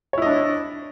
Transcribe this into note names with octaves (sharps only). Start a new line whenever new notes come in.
D4 E4 C#5 D#5